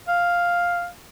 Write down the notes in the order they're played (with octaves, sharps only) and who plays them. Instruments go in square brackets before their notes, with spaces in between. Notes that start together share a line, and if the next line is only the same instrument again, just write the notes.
[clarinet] F5